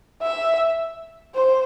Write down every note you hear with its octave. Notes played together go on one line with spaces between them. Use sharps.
E5
C5